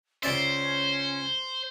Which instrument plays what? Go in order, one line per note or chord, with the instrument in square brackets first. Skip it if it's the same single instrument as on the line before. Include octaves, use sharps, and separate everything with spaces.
[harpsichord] C#2 D5 E5 [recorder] C#4 [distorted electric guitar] C5